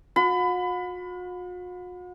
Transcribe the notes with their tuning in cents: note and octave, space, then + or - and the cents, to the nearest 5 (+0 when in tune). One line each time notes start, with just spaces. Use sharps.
F#4 -45 B5 +25